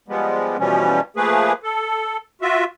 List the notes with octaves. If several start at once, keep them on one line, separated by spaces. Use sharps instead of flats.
F3 G3 G#3 B3
B2 E3 F3 G3 C#4
F3 A3 A#3 G#4 B4
A4
F4 F#4 E5